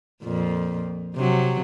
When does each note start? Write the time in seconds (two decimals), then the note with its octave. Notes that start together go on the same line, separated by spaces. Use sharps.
0.23 F2 A#2
1.16 C3 F#3